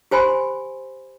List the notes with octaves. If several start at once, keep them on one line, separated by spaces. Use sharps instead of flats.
G4 C5 G#5 B5 C6